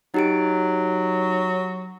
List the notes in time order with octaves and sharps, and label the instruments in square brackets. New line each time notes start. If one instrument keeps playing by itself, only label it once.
[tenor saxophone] F#3 [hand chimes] D#4 G4 D7